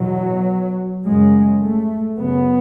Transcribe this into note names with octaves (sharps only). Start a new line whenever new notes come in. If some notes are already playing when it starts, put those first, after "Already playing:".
Already playing: E2 B2 F#3
F#2 C#3 G#3
A3
F#2 C#3 B3